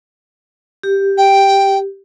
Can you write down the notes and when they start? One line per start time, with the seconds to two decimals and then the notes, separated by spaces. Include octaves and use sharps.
0.83 G4
1.17 G5